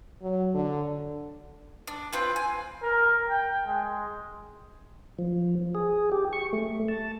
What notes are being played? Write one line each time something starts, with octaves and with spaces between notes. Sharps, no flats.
F#3
D3
D4
C4 F4 B4
G#5
A#4
G5
G#3
F3
G#4
G4
C#6
A3
A5